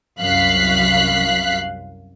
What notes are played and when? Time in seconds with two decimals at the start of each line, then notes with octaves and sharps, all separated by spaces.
0.20 C2 F#2 F5 F#6 B6 C7